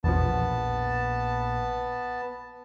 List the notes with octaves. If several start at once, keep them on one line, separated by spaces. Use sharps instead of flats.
A#1 E2 B2 F3 B3 A5